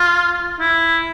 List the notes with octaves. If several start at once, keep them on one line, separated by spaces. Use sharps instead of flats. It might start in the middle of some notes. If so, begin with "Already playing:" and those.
Already playing: F4
E4